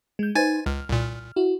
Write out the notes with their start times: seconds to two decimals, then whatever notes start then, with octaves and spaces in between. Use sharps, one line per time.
0.19 G#3 G6
0.35 D#4 B4 C5 G#5 G#6 A6
0.66 C#2 F6
0.89 C2 A#2
1.36 E4 F#4